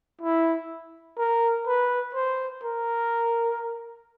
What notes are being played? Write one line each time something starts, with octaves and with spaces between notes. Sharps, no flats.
E4
A#4
B4
C5
A#4